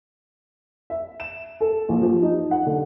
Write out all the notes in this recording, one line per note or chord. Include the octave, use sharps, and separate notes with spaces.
E5
E7
A4
A#1
F3
D#4
F#5
D3